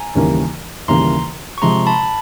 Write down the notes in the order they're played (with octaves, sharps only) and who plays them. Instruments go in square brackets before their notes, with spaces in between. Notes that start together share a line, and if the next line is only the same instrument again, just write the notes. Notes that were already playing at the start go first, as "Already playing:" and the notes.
Already playing: [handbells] G#5 A#5
[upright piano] D#2 C#3 E3 G3 A#3
[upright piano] D#2 C#3 E3 G3 A#3 [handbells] A#5 C6
[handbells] C#6
[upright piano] C3 F3 G#3 [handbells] A#5 C6
[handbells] A5 B5